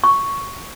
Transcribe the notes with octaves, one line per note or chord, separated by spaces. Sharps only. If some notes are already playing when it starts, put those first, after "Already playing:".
C#6